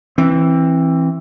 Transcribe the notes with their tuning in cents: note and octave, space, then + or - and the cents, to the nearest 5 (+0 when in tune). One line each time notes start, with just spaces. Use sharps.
E3 +0 C4 +25